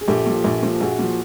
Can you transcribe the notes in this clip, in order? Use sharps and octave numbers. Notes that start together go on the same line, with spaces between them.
G#4
A#1 G4 A4
A#2 F3
A#1
A#2 F3
A#1 F#4 G#4
A#2 F3